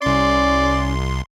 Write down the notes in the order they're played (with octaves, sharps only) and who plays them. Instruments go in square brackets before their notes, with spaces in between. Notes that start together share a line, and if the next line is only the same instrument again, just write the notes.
[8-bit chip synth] C2 C6 [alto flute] C#4 [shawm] D5